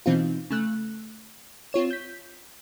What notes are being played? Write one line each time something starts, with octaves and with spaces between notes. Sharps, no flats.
B2 E3 C4 D#4 F4
C#3 A3 F#6
C4 F4 C#5 E7
G6 B6